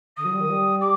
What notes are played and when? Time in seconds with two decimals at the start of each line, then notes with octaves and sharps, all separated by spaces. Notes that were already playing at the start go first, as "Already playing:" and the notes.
0.17 D3 D#6
0.24 F#3
0.33 G3
0.40 D#3
0.49 G3
0.81 D6